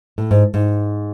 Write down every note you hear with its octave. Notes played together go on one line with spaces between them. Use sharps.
A2
G#2
G#2